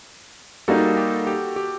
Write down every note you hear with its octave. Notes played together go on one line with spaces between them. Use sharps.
G3 A#3 D#4 F#4 A4
G4
G4
G4